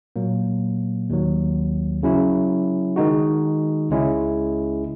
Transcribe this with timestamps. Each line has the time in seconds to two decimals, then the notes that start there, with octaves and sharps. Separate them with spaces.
0.16 A#2 F#3 A#3
1.10 D#2 D#3 F#3
2.03 C#3 F#3 C#4 E4
2.96 D#3 G#3 D#4 F#4
3.90 C#2 C#3 G#3 C#4 E4